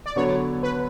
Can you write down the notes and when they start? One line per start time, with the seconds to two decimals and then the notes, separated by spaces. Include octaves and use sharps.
0.06 D5
0.16 D3 F#3 B3 C#5
0.63 B4